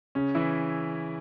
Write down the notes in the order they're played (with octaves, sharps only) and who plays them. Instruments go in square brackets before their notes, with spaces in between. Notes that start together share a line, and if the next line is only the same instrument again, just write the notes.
[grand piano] C#3 C#4
E3 E4